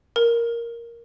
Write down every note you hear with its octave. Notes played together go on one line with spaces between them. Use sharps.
A#4